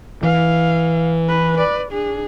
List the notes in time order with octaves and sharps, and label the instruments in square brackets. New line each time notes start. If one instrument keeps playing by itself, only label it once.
[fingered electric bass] E3 [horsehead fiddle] F5
[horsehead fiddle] B4
B4 D5
D4 G#4